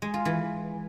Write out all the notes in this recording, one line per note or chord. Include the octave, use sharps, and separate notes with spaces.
G#3
F4
E3